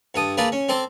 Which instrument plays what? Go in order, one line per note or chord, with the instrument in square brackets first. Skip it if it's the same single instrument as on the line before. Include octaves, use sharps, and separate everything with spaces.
[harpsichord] G2 A4 D#6
A#3 G#4 A4 B4 D5
C#4
C4 A4 C5 D6